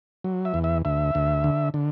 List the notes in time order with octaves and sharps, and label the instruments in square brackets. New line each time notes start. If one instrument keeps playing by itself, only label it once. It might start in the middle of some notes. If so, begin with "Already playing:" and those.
[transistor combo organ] F#3
E5
E2
E5
D2 E5
D2
D3
D3